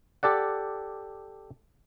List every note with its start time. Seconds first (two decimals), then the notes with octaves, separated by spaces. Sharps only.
0.23 G4 A4 D5 F#5